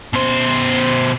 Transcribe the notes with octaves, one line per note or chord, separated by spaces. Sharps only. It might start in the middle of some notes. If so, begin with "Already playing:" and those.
B2 C5